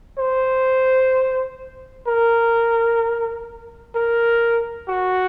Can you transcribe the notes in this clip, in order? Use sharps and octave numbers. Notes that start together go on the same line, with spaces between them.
C5
A#4
A#4
F#4